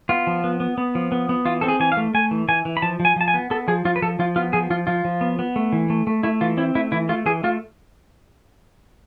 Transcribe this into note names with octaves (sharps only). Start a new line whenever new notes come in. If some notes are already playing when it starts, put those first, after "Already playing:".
B3 F4
F3
B3
B3
B3
F3
B3
B3
E3 F4
C4 A4
G#4
E3 G#5
F5
A3
A3 G#5
E3
E3 G#5
E3
B5
F3 A5
F3
G#5
F3 A5
G#5
B3
B3 A4
F3 G#4
F3 F4
B4
F3 A4
F3 F4
B3 F4
F3 G#4
F3 F4
F3 F4
F3
B3
B3
A3
E3
A3
A3
A3 E4
E3 F4
C4 E4
A3 E4
E3 E4
A3 F4
E3 G#4
A3 F4